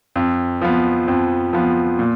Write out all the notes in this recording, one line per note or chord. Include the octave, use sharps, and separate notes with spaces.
F2
F3 B3
F2
F3 B3
A#2